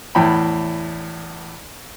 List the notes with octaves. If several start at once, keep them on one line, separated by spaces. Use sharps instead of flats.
E2 A2 G5 B5